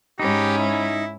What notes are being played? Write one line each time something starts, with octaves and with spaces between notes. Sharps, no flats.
G#2 C#4 D#4 G4 B5
E4